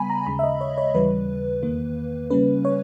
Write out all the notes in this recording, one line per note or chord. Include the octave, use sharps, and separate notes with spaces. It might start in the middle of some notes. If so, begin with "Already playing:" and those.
Already playing: C#3 G3 B3 G#5 B5
A#5
D#2 C#3 G#3 B5
E5
D#5
C#5
C#5
D#2 C#3 E3 G3 B4
E2 D#3 A#3
C#3 G3 A#3 C#4 B4
C#5